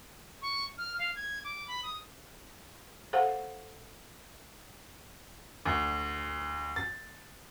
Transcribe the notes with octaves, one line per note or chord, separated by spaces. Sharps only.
C#6
F6
F5
G#6
D6
B5
D#6
A4 C5 F5 F#5
D2
A6